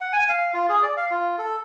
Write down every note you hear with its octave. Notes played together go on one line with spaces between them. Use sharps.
F#5
G#5
F5
F4
G#4
D5
F5
F4
A4